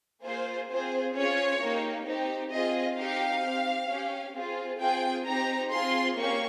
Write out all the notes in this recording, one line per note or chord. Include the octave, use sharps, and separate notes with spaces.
A#3 F4 G#4 C5
C4 F4 G#4 C5
C#4 F4 G#4 C#5
A#3 D#4 G4
C4 D#4 G4
C4 F4 G#4 D#5
C4 D#4 G4 F5
C4 G4
C#4 G4
C4 F4 G#4
C4 F4 G#4 G5
C4 D#4 G4 A#5
C4 F4 G#4 C6
A#3 C#4 G4 C#6